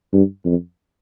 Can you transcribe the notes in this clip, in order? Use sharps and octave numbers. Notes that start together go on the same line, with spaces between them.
G2
F2